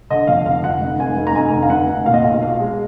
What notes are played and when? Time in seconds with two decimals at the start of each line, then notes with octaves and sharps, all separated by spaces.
0.10 D3 D#5
0.27 F2 F5
0.45 F1 F5
0.64 F1 F#5
0.82 F1
0.99 F1 G#5
1.18 F1
1.27 A#5
1.35 F1 G#5
1.53 D3
1.62 F5
1.70 F1 F#5
1.88 F1
2.06 A#2 F5
2.14 D#5
2.22 B1 F5
2.42 B1 F5
2.60 G#3